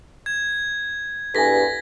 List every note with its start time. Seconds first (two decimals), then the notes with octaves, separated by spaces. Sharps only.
0.26 G#6
1.35 E2 G2 A4 G#5 A#6 B6